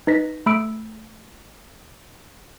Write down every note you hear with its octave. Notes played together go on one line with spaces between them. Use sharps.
D#4 B4 A#6 B6
A3 B5 E6 D7